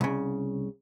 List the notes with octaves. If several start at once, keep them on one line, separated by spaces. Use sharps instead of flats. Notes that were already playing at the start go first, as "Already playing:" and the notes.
C2 C#3